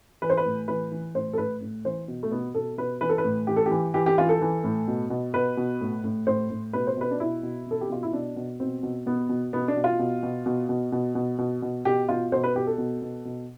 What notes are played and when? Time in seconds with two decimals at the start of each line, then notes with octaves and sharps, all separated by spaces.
0.22 E3 B4
0.30 C5
0.37 B4
0.45 A2
0.68 E3 B4
0.91 E3
1.15 A2 C5
1.33 A4
1.38 A2 B4
1.61 A2
1.85 E3 C5
2.08 B2
2.23 A3
2.31 B2 B3
2.55 B2 A4
2.78 B2 B4
3.01 E3 B4
3.09 A4
3.18 B4
3.24 A2
3.47 E3 G4
3.56 A4
3.66 E3 G4
3.94 E3 G4
4.06 G4
4.18 E3 F4
4.29 A4
4.41 E3
4.64 A2
4.88 B2
5.10 B2
5.34 B2 B4
5.57 B2
5.81 A2
6.04 A2
6.27 A2 C5
6.50 A2
6.73 B2 B4
6.87 C5
6.97 B2 B4
7.11 D4
7.20 B2 E4
7.43 B2
7.66 B2 A4
7.81 G4
7.90 B2 F4
8.03 E4
8.13 B2 D4
8.36 B2
8.60 B2 C4
8.83 B2
9.06 B2 B3
9.29 B2
9.53 B2 B3
9.68 D4
9.77 B2
9.84 F4
9.99 B2
10.23 B2
10.46 B2
10.69 B2
10.92 B2
11.15 B2
11.38 B2
11.62 B2
11.85 B2 G4
12.09 B2 F4
12.32 B2 C5
12.44 B4
12.55 B2 G4
12.67 A4
12.78 B2
13.02 B2
13.25 B2